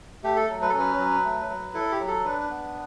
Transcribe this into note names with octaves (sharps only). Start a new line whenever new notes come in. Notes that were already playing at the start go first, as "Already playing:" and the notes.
A3 G4
A4
F#3
B4
A4
C#4
B4
F#3
A3
F#3
E4 A4
G4
F#3
A4
D4 B4
B3